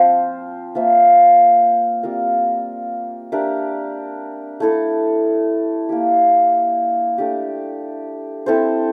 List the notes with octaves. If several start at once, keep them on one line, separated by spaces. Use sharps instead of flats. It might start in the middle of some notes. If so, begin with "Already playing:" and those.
Already playing: F3 C4 F4 C5
A#3 F4 C5 E5
G3 C4 F4 A#4
D4 G4 A#4 E5
A3 E4 A4
A#3 E4 G4
A3 D4 G4
C4 E4 A4 C5